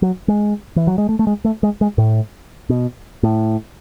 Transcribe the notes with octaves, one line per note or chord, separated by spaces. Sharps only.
F#3
G#3
E3
F#3
G#3
A3
A3
G#3
A3
G#3
G#3
A2
B2
A2